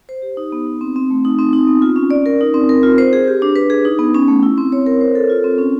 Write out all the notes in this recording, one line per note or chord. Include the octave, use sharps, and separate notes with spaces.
C5
G4
D#4
B3
D#4
C4
C4
A3
D#4
C4
D#4
B3
F4
C#4
D5
A#4
D#4
C4
A#4
F4
C5
G#4
G4
D4
B4
G#4
D#4
B3
C#4
A3
E4
C4
C#5
A#4
C5
A4
F4
C4
C#4